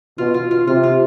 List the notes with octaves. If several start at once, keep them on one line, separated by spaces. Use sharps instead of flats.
B2 F4
F4
F4
C3 F4
F4